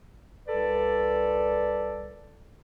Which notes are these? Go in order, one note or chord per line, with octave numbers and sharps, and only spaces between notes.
C2 A4 B4 D5